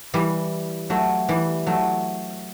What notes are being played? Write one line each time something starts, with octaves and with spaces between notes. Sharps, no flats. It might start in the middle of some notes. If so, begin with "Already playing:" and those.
E3 G3
F#3 A3
E3 G3
F#3 A3